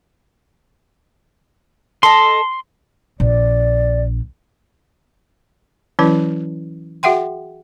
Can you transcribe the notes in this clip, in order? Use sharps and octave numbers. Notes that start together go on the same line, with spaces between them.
A4 D#5 C6
A#1 D5
E3 F#3 C#4 E4 B4
F#4 G#4 E5 F#5 G5 C6